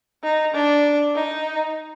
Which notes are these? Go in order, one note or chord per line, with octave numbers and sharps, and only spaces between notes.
D#4
D4
D#4